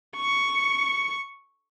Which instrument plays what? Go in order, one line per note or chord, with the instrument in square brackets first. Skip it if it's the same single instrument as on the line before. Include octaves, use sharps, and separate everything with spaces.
[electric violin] C#6 C#7